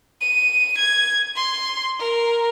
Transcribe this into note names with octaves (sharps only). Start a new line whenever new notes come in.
D#7
G#6
C6
A#4